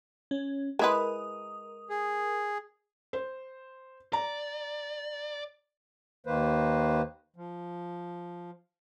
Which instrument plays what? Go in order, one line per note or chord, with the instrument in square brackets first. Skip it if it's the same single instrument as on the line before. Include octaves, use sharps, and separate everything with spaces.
[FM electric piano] C#4
[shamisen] G#3 E4 B4 [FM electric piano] A#4 D#6
[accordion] G#4
[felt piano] C5
[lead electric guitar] D5 [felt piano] A#5
[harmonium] D#2 D#3 A#3 B4 C5
F3